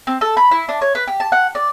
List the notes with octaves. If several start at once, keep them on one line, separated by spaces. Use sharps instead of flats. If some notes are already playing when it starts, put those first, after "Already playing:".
C4
A4
B5
E4
D4
C#5
B4
G4
A5
F#5
D5